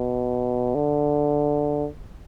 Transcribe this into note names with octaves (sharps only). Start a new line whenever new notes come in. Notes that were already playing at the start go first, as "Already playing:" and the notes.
Already playing: B2
D3